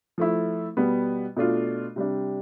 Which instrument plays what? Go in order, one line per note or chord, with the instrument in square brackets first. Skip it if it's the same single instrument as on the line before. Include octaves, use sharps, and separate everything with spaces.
[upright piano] F3 A3 E4
B2 G3 B3
B2 A3 D4 F4
C3 G3 D4